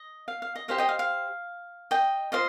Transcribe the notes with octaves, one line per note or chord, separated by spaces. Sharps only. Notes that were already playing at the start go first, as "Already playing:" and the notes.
Already playing: D#5
F5
F5
D#5
G4 C5 D#5 F5
D#5 G5
F5
F5
D#5 G5
F4 C5 D#5 F5